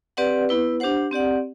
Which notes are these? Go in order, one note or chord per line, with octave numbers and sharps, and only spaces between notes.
C4 G4 B4 D5 F#5
B3 E4 B4
D4 G4 C5 F#5
C4 G4 D5 F#5